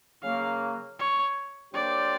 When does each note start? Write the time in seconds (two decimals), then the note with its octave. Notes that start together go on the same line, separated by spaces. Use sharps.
0.23 C#3 F#3 A#3 F5
0.99 C#5
1.74 F#3 A#3 D4 G4 C5 D5